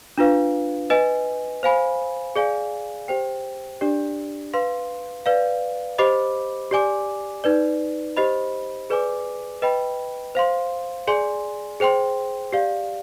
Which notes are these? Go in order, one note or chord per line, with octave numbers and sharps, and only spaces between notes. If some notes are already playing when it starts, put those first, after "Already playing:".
D4 F4 B4 F5
B4 D#5 G#5
C5 F5 G#5 B5
G#4 D5 F5 G#5
G4 C5 G5
D4 G4 D5
B4 F5 C6
B4 D5 F5
G4 C5 D#5 B5 D6
G4 D5 G#5 D6
D#4 B4 D5
G4 C5 D#5 B5
G#4 B4 D5 G#5 D6
B4 D#5 G5 B5
C5 F5 C6
G#4 D5 G#5 C6
G#4 C5 G5 C6
G4 D5 F5